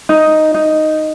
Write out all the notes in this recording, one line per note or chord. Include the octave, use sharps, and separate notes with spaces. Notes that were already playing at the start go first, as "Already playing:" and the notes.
D#4
D#4